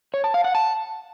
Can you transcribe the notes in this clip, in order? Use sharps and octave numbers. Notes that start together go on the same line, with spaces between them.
C#5
A5
F5
F#5
A5